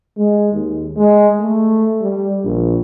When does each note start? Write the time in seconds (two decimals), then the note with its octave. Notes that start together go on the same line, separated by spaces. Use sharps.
0.17 G#3
0.52 D#2
0.96 G#3
1.39 A3
2.01 G3
2.44 A#1